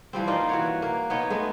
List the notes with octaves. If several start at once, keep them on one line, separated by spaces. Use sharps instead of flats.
E3 F3 G3 C4
A#3 D#4 F4 D5
E3 F#4 C#5
A#3
B3 D#4 C#5
G#3 A3 B3